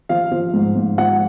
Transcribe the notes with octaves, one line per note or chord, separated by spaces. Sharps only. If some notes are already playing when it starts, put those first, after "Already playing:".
F3 F5
F3
G#2
G#2
F3 F#5